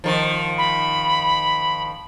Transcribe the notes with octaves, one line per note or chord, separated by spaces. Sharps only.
D#3 F3
B5